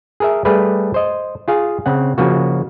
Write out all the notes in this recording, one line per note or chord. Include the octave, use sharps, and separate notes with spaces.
G#4 A#4 E5
G3 A3 G#4 B4
C5 D#5
F4 G#4 F5
C#3 C4 F#5
C#3 F3 A#3 F#4